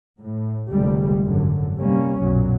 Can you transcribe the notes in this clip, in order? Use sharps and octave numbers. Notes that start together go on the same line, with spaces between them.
A2
F1 C2 D3 G3 G#3
G#1 F#2 D3
C3 G3 A#3 C#4
B1 F#2 A#2 F#3